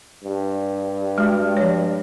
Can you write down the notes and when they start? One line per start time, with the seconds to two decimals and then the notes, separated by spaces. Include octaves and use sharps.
0.24 G2
1.18 G#3 F#4
1.57 F3 C#5